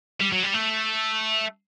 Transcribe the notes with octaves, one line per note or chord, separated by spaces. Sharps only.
G3
F#3
G3
A3